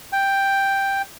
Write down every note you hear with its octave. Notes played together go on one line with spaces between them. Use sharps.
G5